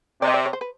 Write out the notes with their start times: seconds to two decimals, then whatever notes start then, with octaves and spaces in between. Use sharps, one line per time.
0.21 C3 D5
0.27 D#5
0.34 D5
0.46 C#5
0.53 C5
0.61 B4